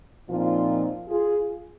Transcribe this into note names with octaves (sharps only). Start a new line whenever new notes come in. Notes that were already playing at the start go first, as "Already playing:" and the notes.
A#2 F3 C4 D#4 F4
F4 G#4